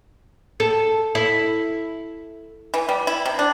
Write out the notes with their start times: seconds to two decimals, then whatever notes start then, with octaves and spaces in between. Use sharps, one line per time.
0.60 A4
1.15 E4
2.74 E3
2.89 G3
3.07 E4
3.25 C3
3.39 D4